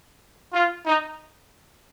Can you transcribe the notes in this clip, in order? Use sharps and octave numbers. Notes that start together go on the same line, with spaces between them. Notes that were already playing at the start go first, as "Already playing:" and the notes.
F4
D#4